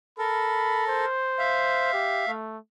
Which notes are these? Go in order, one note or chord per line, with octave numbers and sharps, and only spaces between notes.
A4 A#4 B5
C5
E5 F5
G4
A3